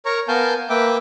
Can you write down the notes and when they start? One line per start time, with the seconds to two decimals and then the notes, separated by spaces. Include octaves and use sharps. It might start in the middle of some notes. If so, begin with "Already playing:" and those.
0.06 A#4 C#5 A#5 C#6
0.28 B3 A#4 F5 G#5 A5 G6
0.70 A#3 B4 E5 G5 D6